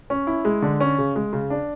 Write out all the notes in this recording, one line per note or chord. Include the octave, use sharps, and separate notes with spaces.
C#4
E4
G#3
D3
C#4
C#3
G#3
C#3
D4